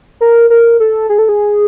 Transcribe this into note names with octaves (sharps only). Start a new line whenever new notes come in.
A#4
A#4
A4
G#4
A4
G#4